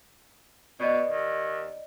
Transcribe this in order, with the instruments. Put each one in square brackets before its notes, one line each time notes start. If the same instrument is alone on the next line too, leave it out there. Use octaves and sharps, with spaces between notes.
[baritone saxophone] B2 [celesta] D5 D#5
[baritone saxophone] D#2